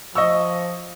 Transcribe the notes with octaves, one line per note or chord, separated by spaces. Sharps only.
F3 D#5 C#6 E6